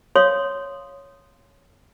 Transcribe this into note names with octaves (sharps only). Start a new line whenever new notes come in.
C#5 F5 C6 D#6